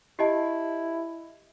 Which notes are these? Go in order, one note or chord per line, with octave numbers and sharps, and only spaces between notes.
E4 G4 D#5 A5